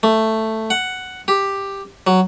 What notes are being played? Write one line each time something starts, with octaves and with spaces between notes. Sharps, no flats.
A3
F#5
G4
F#3